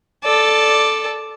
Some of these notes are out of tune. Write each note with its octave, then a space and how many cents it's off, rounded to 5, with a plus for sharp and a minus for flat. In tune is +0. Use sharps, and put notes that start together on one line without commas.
A4 -5 D5 +5